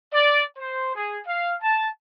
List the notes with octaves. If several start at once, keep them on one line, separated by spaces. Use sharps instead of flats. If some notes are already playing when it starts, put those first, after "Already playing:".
D5
C5
G#4
F5
A5